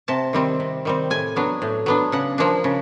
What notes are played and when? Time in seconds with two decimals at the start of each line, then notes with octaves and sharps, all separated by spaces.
0.08 C3 A5
0.33 D#3 G3 C4
0.60 C3
0.85 D#3 G3 C4
1.10 A2 G#5
1.36 F#3 B3 D4
1.62 A2
1.86 F#3 B3 D4
2.12 C#3 F#5
2.38 F3 A#3 D4
2.64 C#3